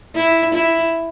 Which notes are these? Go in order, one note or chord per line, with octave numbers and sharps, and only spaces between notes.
E4
E4